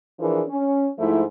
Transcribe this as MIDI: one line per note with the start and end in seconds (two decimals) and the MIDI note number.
0.20 0.43 52
0.20 0.43 53
0.20 0.43 62
0.20 0.43 68
0.20 0.43 70
0.48 0.89 61
0.99 1.23 44
0.99 1.23 53
0.99 1.23 57
0.99 1.23 64